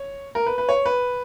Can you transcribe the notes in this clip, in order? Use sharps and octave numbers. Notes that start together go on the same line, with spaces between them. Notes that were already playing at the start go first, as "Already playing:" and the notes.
Already playing: C#5
A#4
B4
B4
C#5
B4